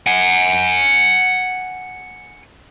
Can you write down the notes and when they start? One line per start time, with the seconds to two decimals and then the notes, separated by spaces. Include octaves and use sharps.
0.07 F#5 G#5